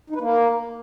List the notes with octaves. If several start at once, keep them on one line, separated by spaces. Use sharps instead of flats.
D#4
B4
A#3